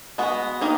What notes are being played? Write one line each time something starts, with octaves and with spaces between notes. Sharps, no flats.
G#3 B3 F#4
D#3 A#3 D#4